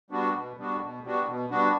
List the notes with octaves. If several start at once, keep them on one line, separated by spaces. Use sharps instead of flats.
G3 B3 D4 F#4
B2
G3 B3 D4 F#4
B2
G3 B3 D4 F#4
B2
G3 B3 D4 F#4